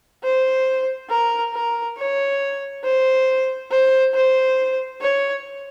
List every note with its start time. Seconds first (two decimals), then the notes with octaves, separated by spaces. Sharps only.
0.23 C5
1.10 A#4
1.54 A#4
1.98 C#5
2.84 C5
3.71 C5
4.14 C5
5.01 C#5